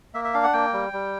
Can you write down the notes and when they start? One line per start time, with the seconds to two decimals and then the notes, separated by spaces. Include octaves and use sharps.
0.14 A#3 E5
0.24 E5
0.34 D4 F5
0.43 F#5
0.53 A#3 G5
0.73 G3
0.93 G3